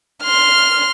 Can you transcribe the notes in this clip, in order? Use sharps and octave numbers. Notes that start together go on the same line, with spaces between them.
C6 F6